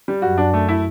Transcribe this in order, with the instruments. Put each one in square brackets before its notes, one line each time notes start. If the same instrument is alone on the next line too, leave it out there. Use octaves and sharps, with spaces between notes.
[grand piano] G3
[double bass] F#2 [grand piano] F#4
[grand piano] D4
A3
E4